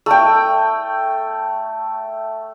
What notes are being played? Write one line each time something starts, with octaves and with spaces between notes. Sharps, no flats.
A3 G5